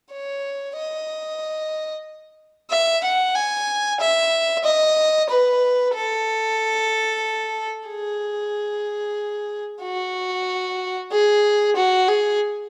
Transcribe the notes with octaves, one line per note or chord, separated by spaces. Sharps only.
C#5
D#5
E5
F#5
G#5
E5
D#5
B4
A4
G#4
F#4
G#4
F#4
G#4